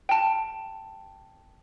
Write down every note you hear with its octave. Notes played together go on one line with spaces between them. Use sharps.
G5 A5